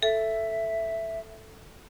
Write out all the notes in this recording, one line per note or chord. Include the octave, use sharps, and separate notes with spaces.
A4 E5